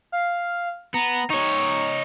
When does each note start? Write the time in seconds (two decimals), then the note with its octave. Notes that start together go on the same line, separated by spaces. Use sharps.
0.12 F5
0.94 B3 A#5
1.30 D#4 C#5 C#6